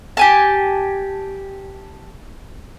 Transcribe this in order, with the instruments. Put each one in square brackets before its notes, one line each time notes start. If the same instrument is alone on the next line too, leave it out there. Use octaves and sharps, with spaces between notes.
[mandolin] G4 G#5 A5